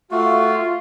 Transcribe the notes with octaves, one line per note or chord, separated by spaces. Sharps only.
A3 F4 F#4